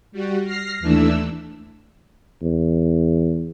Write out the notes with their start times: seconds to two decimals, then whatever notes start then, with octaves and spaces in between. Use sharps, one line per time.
0.12 G3 F#4
0.44 F6 A#6 C7
0.80 D#2 E3 A3 D4 E6
2.42 E2